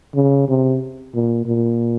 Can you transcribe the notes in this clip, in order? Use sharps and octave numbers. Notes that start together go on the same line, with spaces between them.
C#3
C3
A#2
A#2